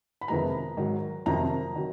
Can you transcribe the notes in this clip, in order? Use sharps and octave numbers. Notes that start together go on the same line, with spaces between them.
B5
F2 C3 D#3 G#3 B3 A#5
G#2 D#3 F#3
F2 C3 D#3 F#3 A#5
D#3 F#3